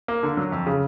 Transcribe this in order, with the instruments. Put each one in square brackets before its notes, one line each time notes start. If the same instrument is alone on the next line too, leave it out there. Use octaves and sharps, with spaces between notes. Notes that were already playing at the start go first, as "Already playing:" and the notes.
[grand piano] A#3
D3
F#3
F2
C#3